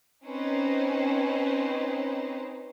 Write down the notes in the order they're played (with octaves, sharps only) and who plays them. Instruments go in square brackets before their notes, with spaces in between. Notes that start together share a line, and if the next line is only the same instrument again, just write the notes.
[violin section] C4 C#4 D#4 B4 C5